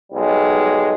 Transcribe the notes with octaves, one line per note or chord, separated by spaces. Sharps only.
B1 G3 G#3